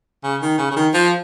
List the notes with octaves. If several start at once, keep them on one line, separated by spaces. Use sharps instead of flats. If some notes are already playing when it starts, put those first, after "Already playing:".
C#3
D#3
C#3
C#3
D#3
F3